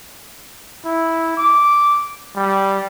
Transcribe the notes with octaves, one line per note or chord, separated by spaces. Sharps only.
E4
D6
G3